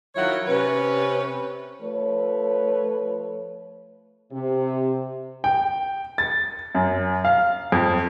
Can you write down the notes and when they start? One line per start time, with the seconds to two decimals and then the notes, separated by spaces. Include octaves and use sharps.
0.15 D#3 F#3 E4 F4 C#5 F#5
0.47 C3 C#4 B4
1.82 F3 A3 A4 B4 C#5
4.32 C3
5.44 G5
6.18 A6
6.75 F#2
7.25 F5
7.72 F2